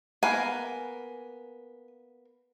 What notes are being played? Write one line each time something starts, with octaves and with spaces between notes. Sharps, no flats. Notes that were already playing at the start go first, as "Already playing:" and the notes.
A#3 B3 A#4 G#5